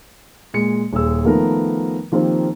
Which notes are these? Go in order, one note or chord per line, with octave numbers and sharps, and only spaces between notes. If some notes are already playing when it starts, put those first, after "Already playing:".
A#2 G#3 C#7
D#1 G#4 E6
D#3 F3 A3 B3 A#4
D#3 F3 A#3 C4 G4